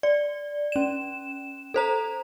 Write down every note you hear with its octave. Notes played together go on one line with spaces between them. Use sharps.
D5
C#4 E7
A4 C5 A#5